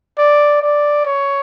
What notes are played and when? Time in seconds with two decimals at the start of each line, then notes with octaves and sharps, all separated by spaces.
0.18 D5
0.62 D5
1.06 C#5